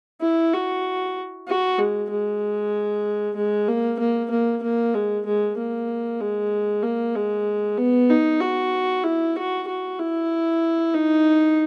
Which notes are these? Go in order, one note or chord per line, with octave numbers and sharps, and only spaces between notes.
E4
F#4
F#4
G#3
G#3
G#3
A#3
A#3
A#3
A#3
G#3
G#3
A#3
G#3
A#3
G#3
B3
D#4
F#4
E4
F#4
F#4
E4
D#4